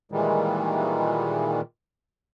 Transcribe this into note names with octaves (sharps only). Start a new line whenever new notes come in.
A#2 D#3 E3 G3 G#3